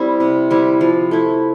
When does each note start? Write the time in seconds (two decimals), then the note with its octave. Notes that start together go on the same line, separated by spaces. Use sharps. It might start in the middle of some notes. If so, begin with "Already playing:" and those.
Already playing: G3 C4 E4
0.20 C3
0.50 G3 C4 E4
0.81 F3
1.11 A3 E4